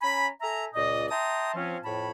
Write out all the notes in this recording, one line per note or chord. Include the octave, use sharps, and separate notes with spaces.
C#4 G#5 A#5 B5
A4 E5 G#5 A#5
C#2 A#2 D5 D#5
E5 G5 A5 A#5 C6 D#6
F3 C4 C#4
F2 A2 C#5 A5 B5